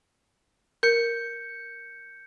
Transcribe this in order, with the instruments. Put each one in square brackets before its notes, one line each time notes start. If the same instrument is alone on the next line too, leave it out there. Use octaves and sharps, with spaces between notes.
[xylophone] A#4 [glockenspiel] G6 C#7